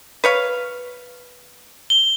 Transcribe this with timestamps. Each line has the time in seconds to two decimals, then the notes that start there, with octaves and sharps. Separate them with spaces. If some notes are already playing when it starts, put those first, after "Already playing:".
0.24 B4 C#5 F5
1.90 G7